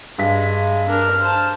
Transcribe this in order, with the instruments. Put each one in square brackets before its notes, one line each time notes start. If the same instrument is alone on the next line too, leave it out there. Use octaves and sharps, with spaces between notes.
[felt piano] G2 B6 [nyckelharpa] G#3
[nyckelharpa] D4 A#4 [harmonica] F6
[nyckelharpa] C5 A5